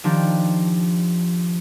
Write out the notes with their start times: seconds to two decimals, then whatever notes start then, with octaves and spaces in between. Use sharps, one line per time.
0.04 D#3 F3 D4 G4